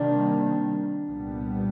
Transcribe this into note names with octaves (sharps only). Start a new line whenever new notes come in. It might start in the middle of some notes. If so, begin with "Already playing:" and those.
Already playing: C3 D#3 G3 A#3 D4
C2 A#2 G3 B3